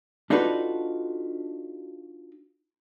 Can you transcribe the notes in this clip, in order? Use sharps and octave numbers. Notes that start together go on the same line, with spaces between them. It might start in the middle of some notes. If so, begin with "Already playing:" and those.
D4 D#4 F4 F#4 A4 B4